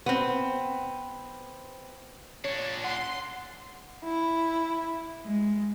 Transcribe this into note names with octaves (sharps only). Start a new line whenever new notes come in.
B3 C4
A#2 D4 C#5
F#5 C6
E4
G#3